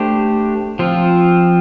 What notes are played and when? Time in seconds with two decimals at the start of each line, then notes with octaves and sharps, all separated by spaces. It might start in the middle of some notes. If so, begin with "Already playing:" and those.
Already playing: A3 D4 G4 C5
0.79 F3 C4 F4